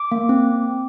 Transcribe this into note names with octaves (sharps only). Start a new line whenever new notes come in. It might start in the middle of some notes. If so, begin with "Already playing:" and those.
Already playing: D6
A#3
C4